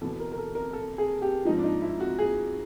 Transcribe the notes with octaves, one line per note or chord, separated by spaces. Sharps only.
E2 B2 A4
A#4
A#4
A4
A#4
A4
G#4
G4
G#2 F3 D#4
D4
D#4
E4
F#4
G#4